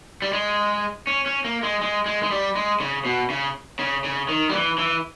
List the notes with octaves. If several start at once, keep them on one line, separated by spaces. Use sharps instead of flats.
G3
G#3
C#4
C#4
A#3
G#3
G#3
G#3
G#3
G3
G#3
C#3
B2
C#3
C#3
C#3
D#3
G3
E3
E3